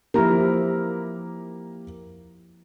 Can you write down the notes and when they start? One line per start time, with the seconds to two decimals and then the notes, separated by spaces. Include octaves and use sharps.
0.14 F3 A#3 E4 G4 A#4 A#5